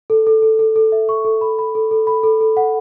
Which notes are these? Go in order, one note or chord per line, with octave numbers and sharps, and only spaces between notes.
A4
A4
A4
A4
A4
E5
C#6
A4
B5
B5
A4
A4
B5
A4
A4
F#5